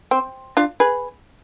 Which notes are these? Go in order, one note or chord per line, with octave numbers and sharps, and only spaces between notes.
C4
D4 F4
G#4 B4